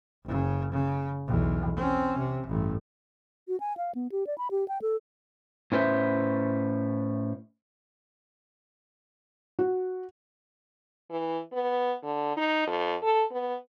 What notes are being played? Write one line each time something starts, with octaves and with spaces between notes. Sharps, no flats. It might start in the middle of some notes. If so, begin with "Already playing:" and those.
F#1 C#3
C#3
B1 E2
C4 C#4
C3
A1 G2
F#4
G#5
F5
B3
G4
D5
B5
G4
G5
A4
A2 C#4 B4 C5 E5
F#4
E3
B3
D3
D#4
F2
A4
B3